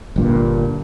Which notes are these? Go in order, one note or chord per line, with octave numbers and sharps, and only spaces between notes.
G1 G2 A#2